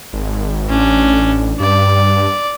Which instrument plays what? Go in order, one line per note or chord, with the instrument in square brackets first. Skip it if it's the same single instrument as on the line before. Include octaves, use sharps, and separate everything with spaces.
[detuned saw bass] G#1
[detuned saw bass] A1 [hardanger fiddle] C#4 D4
[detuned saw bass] G2 [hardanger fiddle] D5